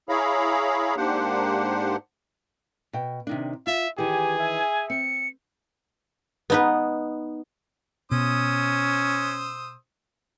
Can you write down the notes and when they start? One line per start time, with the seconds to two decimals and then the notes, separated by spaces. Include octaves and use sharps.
0.09 E4 G#4 C#5 F5 A#5 B5
0.97 G#2 A#3 D4 G4 C5 F#5
2.93 B2 G5
3.27 C3 D#3 D4
3.67 F4 E5
3.98 D#3 E3 G4 G#4 G#5
4.39 E5
4.90 C4 C#7
6.50 B3 D#4 B4
8.11 B2 C#4 C5 D#6 E6